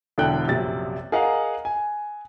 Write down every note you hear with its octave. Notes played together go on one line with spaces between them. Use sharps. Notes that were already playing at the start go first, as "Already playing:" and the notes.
E1 D3 E4 A4 G5 F#6
A#1 F#2 C3 A6
G#4 A#4 D#5 F5 F#5 A#5
G#5